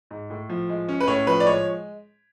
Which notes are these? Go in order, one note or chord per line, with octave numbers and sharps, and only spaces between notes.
G#2
A2
F3
G#3
C#4
B4
A2 C#5
F3 B4
D5
G#3 C#5